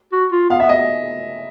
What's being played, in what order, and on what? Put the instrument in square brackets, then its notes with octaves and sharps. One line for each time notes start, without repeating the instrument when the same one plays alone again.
[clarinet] F#4
F4
[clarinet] B3 [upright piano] F5
[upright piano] E5
[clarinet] B3
[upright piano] D#5